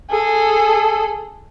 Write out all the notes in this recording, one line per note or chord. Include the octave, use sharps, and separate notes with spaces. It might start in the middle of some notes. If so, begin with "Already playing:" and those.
G#4 A4